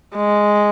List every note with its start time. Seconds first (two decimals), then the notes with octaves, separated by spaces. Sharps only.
0.16 G#3